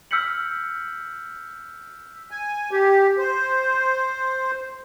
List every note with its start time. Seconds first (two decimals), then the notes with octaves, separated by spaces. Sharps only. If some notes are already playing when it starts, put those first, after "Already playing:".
0.11 E6 F6 G6 B6 C#7 F#7
2.31 G#5
2.71 G4
3.18 C5